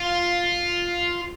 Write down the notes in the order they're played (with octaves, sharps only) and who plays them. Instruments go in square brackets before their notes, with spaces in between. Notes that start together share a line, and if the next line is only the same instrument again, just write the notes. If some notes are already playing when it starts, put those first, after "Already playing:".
Already playing: [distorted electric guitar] F4